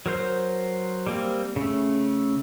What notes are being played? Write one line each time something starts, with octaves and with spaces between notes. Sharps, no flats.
F#3 A#4 C5 G6
G3 A#3 C4
C#3 A3